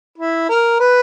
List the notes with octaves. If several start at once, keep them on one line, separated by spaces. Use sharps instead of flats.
E4
A#4
B4